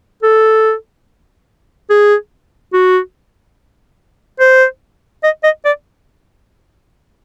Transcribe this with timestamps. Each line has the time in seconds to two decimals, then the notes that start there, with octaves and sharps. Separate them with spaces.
0.23 A4
1.90 G#4
2.73 F#4
4.40 C5
5.24 D#5
5.44 D#5
5.65 D5